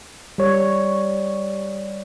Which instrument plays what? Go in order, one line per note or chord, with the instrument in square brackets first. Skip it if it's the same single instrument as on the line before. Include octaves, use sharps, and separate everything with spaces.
[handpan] G3 C#5